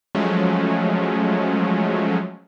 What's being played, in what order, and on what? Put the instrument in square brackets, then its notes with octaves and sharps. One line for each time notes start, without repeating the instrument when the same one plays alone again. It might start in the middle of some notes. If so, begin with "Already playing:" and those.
[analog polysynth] F3 F#3 G#3 A3 C#4